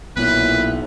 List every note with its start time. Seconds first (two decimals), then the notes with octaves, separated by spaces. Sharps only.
0.17 B1 A#2 B3 E4 B4